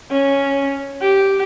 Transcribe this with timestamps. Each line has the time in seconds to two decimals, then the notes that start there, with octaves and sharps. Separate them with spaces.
0.11 C#4
1.01 G4